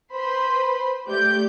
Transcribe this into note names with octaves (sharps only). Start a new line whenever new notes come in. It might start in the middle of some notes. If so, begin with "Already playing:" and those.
B4 C5 B5 C6
A3 G4 D5 G6